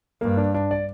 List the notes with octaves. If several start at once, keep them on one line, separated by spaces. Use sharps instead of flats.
G2 A#3
D4
D4
D5